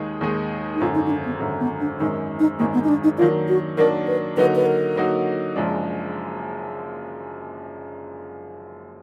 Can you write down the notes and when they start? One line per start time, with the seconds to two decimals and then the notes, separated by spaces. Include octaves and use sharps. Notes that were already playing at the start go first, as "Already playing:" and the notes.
Already playing: D#2 D#3 G#3 D#4 G#4
0.21 D#2 D#3 G#3 D#4 G#4
0.75 D#4
0.80 G#1 F#2 D3 F4
0.95 D#4
1.06 D#4
1.11 D4
1.25 B3
1.40 G#1 F#2 D3
1.60 B3
1.80 D4
1.99 G#1 F#2 D#3 G#3 D#4
2.39 D#4
2.59 G#1 F#2 D#3 G#3 A#3
2.74 B3
2.84 D#4
2.88 D4
3.04 D#4
3.18 D#3 F#3 A#3 D4 F4
3.48 F#4
3.77 D#3 F#3 A#3 D4 A#4
4.07 B4
4.37 D3 F#3 A#3 D#4 F#4 B4
4.56 B4
4.66 A#4
4.96 D3 F#3 A#3 D#4 F#4
5.56 F#1 F#2 F3 G#3 D4